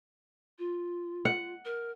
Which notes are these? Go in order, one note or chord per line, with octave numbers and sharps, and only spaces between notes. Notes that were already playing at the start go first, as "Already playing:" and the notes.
F4
F#5
A#4